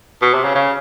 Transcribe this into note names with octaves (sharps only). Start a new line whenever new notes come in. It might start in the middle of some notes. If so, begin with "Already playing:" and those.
B2
C3
C#3
C#3